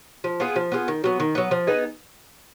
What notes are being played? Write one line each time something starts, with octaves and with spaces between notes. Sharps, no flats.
F3
B3 F4 G#4
F3
B3 F4 G#4
D#3
F#3 B3
D#3
F#3 B3
F3
B3 D#4 G#4